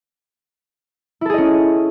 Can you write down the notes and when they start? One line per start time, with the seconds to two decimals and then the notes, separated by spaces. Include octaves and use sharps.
1.21 E4
1.25 A4
1.30 G#4
1.34 D#5
1.38 C#4